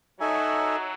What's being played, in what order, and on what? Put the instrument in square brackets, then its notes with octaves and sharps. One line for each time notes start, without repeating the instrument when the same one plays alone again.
[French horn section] F#3 [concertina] D#4 A4 E5 G#5